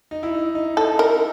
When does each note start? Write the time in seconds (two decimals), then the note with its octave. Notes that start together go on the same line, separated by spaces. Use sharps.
0.11 D#4
0.23 E4
0.34 D#4
0.55 D#4
0.77 D#4 A4
0.99 A#4